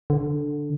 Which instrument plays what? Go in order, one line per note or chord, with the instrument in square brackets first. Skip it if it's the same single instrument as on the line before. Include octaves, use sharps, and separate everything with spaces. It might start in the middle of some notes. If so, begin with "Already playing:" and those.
[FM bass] D3